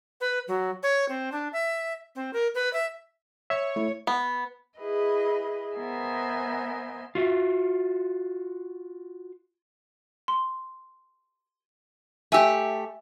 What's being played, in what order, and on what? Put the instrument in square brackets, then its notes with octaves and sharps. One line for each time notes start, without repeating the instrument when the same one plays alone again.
[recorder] B4
F#3
C#5
C4
D4
E5
C4
A#4
B4
E5
[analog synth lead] C#5 [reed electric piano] E5
[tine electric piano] A3 E4
[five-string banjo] B3
[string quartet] E4 G#4 B4 D#5
B3 A#4 C5 D#5 E5 G#5
[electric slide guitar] F4 F#4 E5
[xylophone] C6
[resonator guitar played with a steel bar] A3 G4 [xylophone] E5 G#5 E6